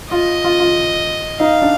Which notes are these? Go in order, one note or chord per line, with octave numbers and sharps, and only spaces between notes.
F4 D#5
F4
F4
D#4 F5
D4